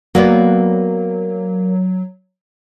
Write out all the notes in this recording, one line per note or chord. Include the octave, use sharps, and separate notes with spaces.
F#3 A#3 B3 F#4 D5